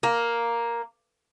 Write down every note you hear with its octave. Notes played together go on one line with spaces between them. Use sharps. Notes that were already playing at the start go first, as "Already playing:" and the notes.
A#3